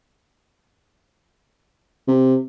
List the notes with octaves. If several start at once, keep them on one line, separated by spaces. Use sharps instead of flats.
C3